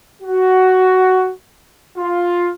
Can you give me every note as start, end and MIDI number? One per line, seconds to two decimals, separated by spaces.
0.22 1.31 66
1.98 2.50 65